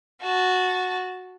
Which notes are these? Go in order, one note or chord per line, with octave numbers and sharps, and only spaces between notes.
F#4 A5